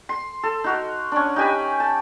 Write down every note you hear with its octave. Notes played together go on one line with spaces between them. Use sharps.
C6
A4
D#4 F#4 A#4
C#4 D4
D#4 G4 G#5 B5
A5